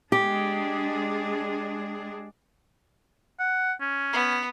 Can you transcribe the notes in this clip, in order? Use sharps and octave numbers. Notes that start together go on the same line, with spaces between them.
G#3 D4 G4 G#4
F#5
C#4
B3